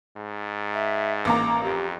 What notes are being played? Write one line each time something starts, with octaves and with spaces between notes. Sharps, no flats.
G#2
E5
A1 A#3 A#5 D6
F2 G4